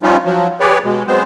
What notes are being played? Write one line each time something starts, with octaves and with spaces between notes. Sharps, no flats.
F3 G3 C#4 D#4 F4
F3 F#3
G4 G#4 B4 C#5 D5
B2 G#3
F#3 G#3 B3 C4 C5